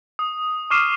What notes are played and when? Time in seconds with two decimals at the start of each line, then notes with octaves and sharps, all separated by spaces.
0.19 D#6
0.70 C#6 D6 F6 C7 D#7 E7